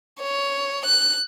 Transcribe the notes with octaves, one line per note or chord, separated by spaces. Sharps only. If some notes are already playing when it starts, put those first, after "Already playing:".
C#5
F#6